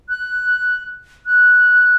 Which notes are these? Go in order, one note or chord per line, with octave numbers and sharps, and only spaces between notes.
F#6
F#6